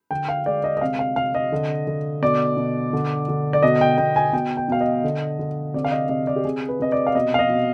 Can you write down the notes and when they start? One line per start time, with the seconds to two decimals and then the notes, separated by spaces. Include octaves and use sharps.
0.11 D3 G5
0.29 F5
0.46 G#3 D5
0.64 D#5
0.77 D#5
0.81 C3 F5
0.99 F5
1.16 C3 F5
1.35 D#5
1.52 D3
1.87 D3
2.22 B2 D5
2.57 B2
2.93 D3
3.29 D3
3.53 D5
3.63 B2 D#5
3.81 G5
3.98 B2 G5
4.16 G#5
4.33 B2 G5
4.57 G5
4.68 B2 F5
4.81 D#5
5.04 D3
5.39 D3
5.74 C3 D5
5.85 F5
5.91 D#5
6.09 C3 D#5
6.27 D5
6.36 G4
6.45 C3 G#4
6.69 B4
6.80 C3 D#5
6.92 D5
7.07 F5
7.15 B2 D#5
7.34 F5
7.39 D#5
7.50 B2